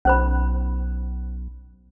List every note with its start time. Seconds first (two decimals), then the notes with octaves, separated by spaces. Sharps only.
0.05 B1 C#4 C5 B5